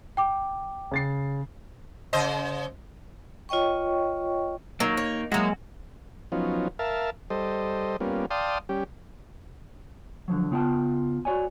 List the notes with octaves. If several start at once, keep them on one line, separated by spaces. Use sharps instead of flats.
G5 D6
C#3 A6 C7
C#3 C5 D#5
F4 C#5 D#5 G5 C#6
F#3 A#3 D#4
C#5
F#3 G#3 A#3 E4 F#4
F3 F#3 B3 C#4 D#4 F4
A#4 E5 F5 A5
G3 A4 C5 D#5
G3 A#3 B3 C#4 F4
D5 F5 G5 A5 C6 D#6
G3 C#4 G4
D3 F3 F#3
C#3 B3 F4 F#5 G5 A5
F#4 C#5 D5 G#5